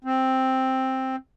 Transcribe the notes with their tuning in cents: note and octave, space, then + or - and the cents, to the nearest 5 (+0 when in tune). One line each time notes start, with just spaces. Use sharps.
C4 +5